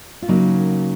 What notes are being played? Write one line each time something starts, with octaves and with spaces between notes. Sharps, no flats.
F4
C#3 F#3 A#3 D#4